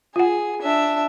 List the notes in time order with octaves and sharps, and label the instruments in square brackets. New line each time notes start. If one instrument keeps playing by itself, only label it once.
[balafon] F4 F#5 [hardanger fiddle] G#4
[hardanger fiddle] D4 E5